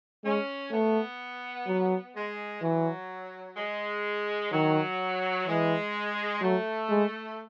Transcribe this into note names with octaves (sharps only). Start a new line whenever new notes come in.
G#3 C#4
A3 B3
F#3
G#3
E3 F#3
G#3
D#3 F#3
E3 G#3
F#3 A3
G#3